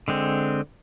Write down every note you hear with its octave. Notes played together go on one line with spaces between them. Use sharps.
D3 G#3 C4